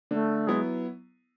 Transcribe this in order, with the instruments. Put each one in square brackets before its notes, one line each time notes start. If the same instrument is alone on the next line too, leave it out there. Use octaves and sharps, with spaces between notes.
[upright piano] D3 [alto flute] A3
[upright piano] F#3 B3 E4 [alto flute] G#3